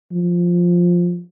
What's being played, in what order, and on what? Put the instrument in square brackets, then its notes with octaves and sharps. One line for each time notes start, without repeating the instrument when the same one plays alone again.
[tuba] F3